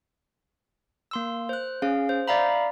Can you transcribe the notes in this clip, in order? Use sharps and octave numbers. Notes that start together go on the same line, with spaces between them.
A#3 C6 E6
C5 F#6
C#4 G#4 F5
C5
D5 E5 F5 A#5 B5